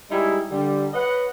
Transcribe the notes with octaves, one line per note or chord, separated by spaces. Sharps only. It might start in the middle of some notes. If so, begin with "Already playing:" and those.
G3 G#3 D#4 E4 G#4
D3 G3
B4 C#5 D#5 F#5